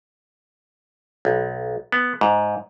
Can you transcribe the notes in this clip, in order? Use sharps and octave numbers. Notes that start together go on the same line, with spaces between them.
B1
B3
G#2